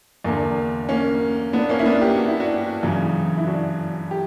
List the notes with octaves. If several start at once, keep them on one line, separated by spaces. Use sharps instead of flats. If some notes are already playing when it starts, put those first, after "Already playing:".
E2 D3 A#3
A#3 C#4
B3 D4
A#3 C#4
E4
B3 D4
G4
F#4
E4
D4 F#4
F#2 C#3 E3
E4
D4 F#4
G4